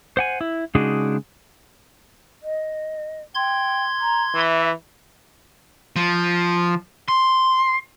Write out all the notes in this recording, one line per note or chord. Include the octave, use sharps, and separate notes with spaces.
C5 F#5 G#5
E4
C#3 G#3 D4 D#4 F#4 G#4
D#5
G5 C6 G#6
A#5
E3 E5
F3
C6